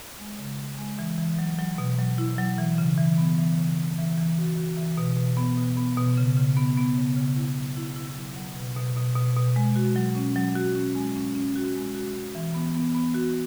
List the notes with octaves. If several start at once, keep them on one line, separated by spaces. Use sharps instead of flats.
G#3
C#3
C#3
G#3
E3
E3
F#3
F#3
B2
F#3
E4
F#3
E3
C#3
E3
B3
E3
C#3
E3
E3
E3
F#4
F#4
E3
B2
B2
B3
B2
B3
B2
C#3
C#3
B3
B3
C#3
C#3
E4
F#3
E4
E4
F#3
F#3
B2
B2
B2
B2
B2
G#3
F#4
F#3
C#4
F#3
F#4
C#4
G#3
C#4
C#4
F#4
G#3
F#4
F#4
E3
B3
B3
B3
F#4